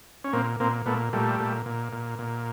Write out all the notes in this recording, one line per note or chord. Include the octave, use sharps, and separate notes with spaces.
C#4
A#2 A#3 C4
A#2 A#3 C4
A#2 A3 B3
A#2 G3 A3
A#2
A#2
A#2
A#2